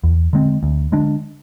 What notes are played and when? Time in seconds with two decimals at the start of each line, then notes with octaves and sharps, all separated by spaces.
0.04 E2
0.33 D3 G#3 C4
0.63 D2
0.92 D3 G#3 D4